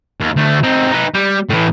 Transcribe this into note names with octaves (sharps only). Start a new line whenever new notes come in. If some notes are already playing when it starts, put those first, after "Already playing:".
D#2
D2 A3
C4 D#4
D#4 B4
G3
A2 E3